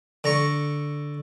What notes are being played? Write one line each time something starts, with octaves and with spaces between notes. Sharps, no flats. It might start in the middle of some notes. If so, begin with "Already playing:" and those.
D3 A#5 C#6